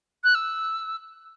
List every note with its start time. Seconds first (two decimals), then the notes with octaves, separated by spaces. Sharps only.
0.24 F#6
0.35 E6